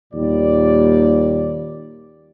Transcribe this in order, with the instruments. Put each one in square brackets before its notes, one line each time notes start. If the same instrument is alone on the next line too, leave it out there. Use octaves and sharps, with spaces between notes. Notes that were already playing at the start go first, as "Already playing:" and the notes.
[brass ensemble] D#2 A#2 G3 D5